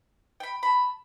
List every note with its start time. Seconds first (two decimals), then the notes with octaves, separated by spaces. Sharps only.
0.40 G5 B5
0.63 A5 B5